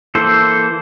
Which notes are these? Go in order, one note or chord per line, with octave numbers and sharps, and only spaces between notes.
E3 A#3 A4 C5